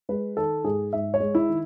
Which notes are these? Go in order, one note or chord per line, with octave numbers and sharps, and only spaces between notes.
G#3 B4
D#3 A4
G#2 G#4
G#2 E5
C#5
G#3
E4
D#3